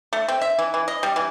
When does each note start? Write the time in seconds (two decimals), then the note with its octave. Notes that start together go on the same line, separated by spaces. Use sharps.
0.13 A3
0.28 C4
0.42 E5
0.59 E3
0.74 E3
0.88 D#5
1.03 G3
1.16 E3